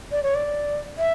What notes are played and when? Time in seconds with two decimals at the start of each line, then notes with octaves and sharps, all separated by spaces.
0.12 D5
0.23 C#5
0.35 D5
0.98 E5